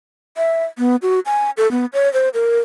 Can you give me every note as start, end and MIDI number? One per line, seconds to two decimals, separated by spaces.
0.37 0.64 76
0.78 0.96 59
1.02 1.20 66
1.26 1.50 80
1.57 1.69 69
1.71 1.86 59
1.93 2.12 73
2.13 2.29 72
2.34 2.61 70